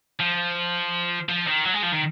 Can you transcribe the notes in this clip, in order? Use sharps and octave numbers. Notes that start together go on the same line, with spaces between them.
F3
F3
D#3
F#3
G#3
F3
D#3